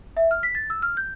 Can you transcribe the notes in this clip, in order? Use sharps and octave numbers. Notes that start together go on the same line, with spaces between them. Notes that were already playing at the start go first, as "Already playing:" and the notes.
E5
F6
B6
A6
E6
F6
G6